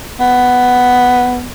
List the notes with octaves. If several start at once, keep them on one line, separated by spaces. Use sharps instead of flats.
B3